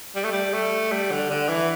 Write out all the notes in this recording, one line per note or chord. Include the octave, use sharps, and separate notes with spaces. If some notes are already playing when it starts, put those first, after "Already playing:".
G3
A3
G3
A3
G3
D3
D3
E3